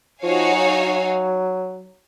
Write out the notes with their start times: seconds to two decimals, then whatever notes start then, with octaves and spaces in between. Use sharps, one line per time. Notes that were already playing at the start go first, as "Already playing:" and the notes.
0.23 F3 D#4 F#4 C#5 F5 G#5
0.53 F#3